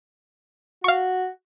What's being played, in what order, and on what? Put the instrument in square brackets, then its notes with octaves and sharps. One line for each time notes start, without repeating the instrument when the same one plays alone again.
[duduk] F#4 [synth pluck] F5 C#6